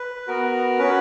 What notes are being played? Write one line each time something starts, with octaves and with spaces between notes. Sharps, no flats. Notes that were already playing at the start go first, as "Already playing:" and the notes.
Already playing: B4
B3 F#4 A#4
C#4 F#4 B4